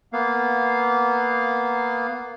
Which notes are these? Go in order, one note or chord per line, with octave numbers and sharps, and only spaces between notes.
A#3 B3 F5